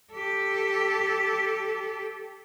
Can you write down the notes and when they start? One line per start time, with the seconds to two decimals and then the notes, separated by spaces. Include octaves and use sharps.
0.13 G4 A4